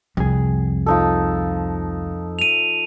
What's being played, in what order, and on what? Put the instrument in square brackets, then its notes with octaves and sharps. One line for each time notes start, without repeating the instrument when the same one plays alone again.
[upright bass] C2 [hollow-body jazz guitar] F2 G#4
[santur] F3 D#4 A4
[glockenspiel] D#7 F7